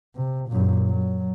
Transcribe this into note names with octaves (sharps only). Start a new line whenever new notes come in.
C3
F#2 A#2
F#3